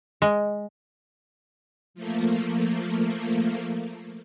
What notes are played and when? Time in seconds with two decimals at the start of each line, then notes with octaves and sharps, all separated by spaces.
0.22 G#3
1.94 F3 A3 A#3